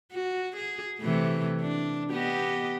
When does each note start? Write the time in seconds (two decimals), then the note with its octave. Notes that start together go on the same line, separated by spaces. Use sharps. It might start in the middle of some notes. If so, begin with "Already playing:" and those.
0.12 F#4
0.56 G#4
1.00 C3 E3 A3
1.62 D4
2.12 B3 G4 D#5